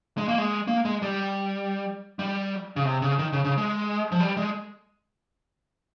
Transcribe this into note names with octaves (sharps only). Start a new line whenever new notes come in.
G#3
A#3
G#3
A#3
G#3
G3
G3
C#3
C3
C#3
D#3
C#3
C#3
G#3
F3
G3
G#3